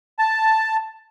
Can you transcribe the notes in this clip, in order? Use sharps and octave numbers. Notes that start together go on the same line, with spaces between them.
A5